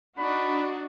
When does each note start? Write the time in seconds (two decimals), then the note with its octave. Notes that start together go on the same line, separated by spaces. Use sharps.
0.18 D4 D#4 F#4 B5